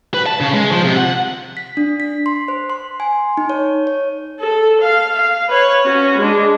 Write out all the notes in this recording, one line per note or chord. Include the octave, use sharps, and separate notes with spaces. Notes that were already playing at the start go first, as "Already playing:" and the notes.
B4
A5
C#3
G#3
F3
C3
F#5
B6
D4
B6
C6
C5
C6
G#5
D#4
C#5
C#5
A4
F5
F5
B4 C#5
C#4 F#4
G#3 D4